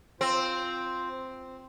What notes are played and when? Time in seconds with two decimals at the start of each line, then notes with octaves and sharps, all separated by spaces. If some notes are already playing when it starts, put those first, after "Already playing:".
0.21 C4 F4 C5